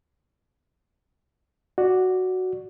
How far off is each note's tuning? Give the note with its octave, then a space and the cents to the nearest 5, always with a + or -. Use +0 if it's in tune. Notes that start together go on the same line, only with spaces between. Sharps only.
F#4 +0 D5 +0